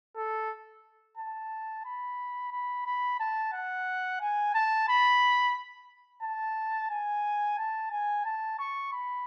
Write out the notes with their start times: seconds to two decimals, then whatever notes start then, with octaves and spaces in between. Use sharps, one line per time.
0.17 A4
1.17 A5
1.85 B5
2.52 B5
2.86 B5
3.20 A5
3.53 F#5
4.21 G#5
4.55 A5
4.89 B5
6.23 A5
6.90 G#5
7.58 A5
7.91 G#5
8.25 A5
8.59 C#6
8.93 B5